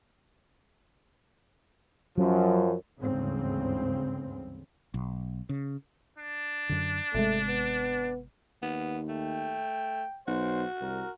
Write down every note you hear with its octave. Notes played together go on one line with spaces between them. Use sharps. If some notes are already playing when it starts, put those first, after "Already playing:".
F#2 F3 F#3
G1 D2 G#2 C#3 E3 C4
B1
C#3
D4
F#2 D3
G#1 C3 G#3 A3
B3
D#2 B3
A3 G5
B1 F#4 C5
C2 A#4